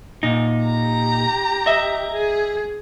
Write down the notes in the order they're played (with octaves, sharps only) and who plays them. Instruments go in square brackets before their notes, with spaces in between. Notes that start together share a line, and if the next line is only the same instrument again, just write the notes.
[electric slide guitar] A#2 D#4
[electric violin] G4 A#5
[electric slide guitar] D#5 E5
[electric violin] G#4